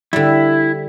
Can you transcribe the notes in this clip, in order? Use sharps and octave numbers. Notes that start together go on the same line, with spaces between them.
D3 G3 E4